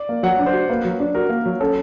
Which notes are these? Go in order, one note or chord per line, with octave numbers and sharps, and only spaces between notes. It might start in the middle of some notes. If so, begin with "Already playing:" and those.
Already playing: D5
A#3
F#3 F#5
D4
C5
F#4
A#3 B4
F#3
D4
F#4 A#4
A#3
F#3
C#4 A4